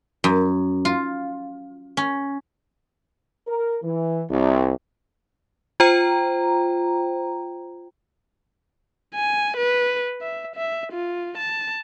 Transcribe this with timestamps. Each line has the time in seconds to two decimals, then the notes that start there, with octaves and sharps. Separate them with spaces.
0.24 F#2
0.85 F4
1.97 C#4
3.47 A#4
3.83 E3
4.30 C2
5.80 F4 C5 G5 A#5
9.15 G#5
9.57 B4
10.21 E5
10.56 E5
10.93 F4
11.37 A5